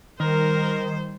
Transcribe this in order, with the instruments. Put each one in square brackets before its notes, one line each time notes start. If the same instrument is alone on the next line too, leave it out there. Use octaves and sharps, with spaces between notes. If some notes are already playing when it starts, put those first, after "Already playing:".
[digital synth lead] D#3 [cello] G3 C5 [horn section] A#4